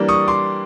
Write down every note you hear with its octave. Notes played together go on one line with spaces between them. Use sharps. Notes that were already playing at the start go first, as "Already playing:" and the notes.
Already playing: E3 G3 A#3 D4
C#6 D#6
C6 D6